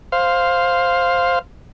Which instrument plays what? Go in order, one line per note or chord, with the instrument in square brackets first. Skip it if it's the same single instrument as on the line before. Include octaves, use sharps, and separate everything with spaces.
[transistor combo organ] C5 F5